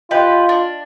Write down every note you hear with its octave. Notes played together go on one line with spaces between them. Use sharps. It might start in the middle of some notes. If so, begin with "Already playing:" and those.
F4 G4 B4 D#5
D4